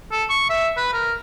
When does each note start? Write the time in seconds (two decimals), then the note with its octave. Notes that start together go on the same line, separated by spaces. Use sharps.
0.12 A4
0.30 C#6
0.50 E5
0.77 B4
0.93 A#4